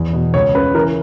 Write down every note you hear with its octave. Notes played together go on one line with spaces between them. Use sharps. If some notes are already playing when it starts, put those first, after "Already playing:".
Already playing: E2
B2
C#2 C#5
C#3 B4
E3 A#4